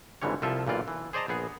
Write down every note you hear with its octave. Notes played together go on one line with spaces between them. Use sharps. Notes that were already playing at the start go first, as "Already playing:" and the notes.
G#1 G#2 D3 E3 G3 C#5
C2 F3 F4 A4 E5
B1 A#2 E3 F4 D5
E3
G#4 C5 D5 D#5 A5 A#5
A#1 B3 G#4